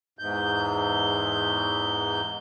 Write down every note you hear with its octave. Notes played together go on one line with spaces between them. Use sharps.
E2 G#2 G6